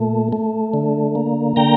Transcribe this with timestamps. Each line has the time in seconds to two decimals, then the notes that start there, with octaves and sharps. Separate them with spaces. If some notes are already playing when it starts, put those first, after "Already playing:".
Already playing: A#2 A3
0.33 A3
0.74 D3
1.15 A#3
1.56 D3 G5 A#5